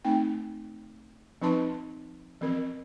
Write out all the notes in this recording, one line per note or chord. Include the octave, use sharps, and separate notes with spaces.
A3 C4 D#4 G5
F3 C4 D#4 B4 A5 C6
E3 F3 C4 A#4